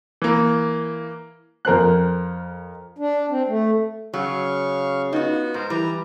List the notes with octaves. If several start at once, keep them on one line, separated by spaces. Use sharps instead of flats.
E3 A#3
F2 A#4 C5 F#6
D4
C4
A3
C#3 F#3 F5 C#6
B3 D#4 F4 F#4
G#2 A#4 C5
E3 G3 A#5